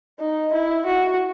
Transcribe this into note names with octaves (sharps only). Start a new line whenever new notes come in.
D#4
E4
F#4